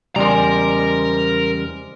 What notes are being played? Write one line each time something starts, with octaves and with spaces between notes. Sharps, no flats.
E2 C#3 G3 G#3 A#4 C5 D5 A#5